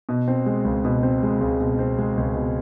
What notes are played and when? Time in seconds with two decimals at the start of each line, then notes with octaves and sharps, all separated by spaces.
0.09 B2
0.28 C4
0.46 G#3
0.65 C#2
0.85 B2
1.03 C4
1.23 G#3
1.41 C#2
1.60 B2
1.79 C4
1.98 G#3
2.17 C#2
2.35 B2